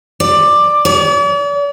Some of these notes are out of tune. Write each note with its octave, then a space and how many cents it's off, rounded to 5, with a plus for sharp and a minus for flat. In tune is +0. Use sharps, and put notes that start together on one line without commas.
D5 +10
D5 -45